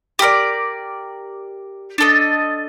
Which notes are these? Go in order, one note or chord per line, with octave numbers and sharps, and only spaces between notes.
G4 A#4 D5
D4 A4 D#5